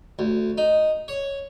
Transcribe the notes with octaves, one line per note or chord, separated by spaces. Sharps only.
D2
D#4
C#5